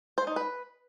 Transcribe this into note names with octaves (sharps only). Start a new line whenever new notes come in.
C5
D#4
B4